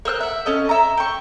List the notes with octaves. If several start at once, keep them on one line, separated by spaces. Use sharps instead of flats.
A#4 C5 E6 F#6
E5 F#5
C#4 A4 D#5
E5 A#5
G5 C#6